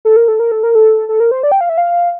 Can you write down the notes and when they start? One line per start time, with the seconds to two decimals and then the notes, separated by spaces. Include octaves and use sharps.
0.05 A4
0.16 A#4
0.28 A4
0.39 A#4
0.52 A4
0.63 A#4
0.75 A4
1.09 A4
1.20 A#4
1.31 C5
1.43 D5
1.52 G5
1.61 F5
1.69 E5
1.78 F5